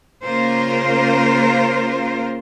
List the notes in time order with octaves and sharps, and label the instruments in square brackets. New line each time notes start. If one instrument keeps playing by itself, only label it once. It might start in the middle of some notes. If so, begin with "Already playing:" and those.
[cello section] C#3 A#3 F4 A#4 C5